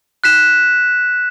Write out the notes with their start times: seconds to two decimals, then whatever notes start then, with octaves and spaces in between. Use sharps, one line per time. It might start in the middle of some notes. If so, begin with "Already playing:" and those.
0.24 F#6 B6 E7